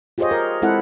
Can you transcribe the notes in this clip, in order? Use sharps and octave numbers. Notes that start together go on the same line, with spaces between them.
F4 G4 G#4 C5 C#5 D#5
A#4
G#3 C4 E4 A4 E5 F#5